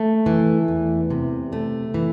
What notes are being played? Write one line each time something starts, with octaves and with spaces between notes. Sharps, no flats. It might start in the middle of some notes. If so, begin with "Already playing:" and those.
Already playing: A3
E3
E2
C3
A3
E3